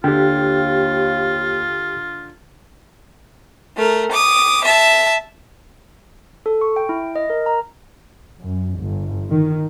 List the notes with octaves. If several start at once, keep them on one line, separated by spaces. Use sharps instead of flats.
D#2 D3 F4 G4 G5
A3 A#4
D6 D#6
E5 A5
A4
C#6
G5
E4
D#5
A#4
A#5
F#2
G1
D#3